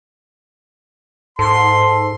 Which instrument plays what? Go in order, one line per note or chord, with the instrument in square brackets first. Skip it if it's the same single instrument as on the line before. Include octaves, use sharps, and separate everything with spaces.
[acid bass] G#2 [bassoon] A4 [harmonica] C6